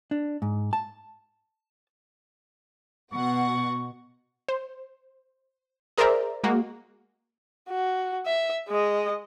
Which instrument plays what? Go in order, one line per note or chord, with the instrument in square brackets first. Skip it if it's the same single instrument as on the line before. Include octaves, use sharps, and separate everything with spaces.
[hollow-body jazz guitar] D4
G#2
A5
[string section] B2 F#5 [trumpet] C#6
[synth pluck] C5
G#4 A#4 C5 D5 E5 A#5
G#3 A#3 F#4
[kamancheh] F#4
E5
G#3 D#5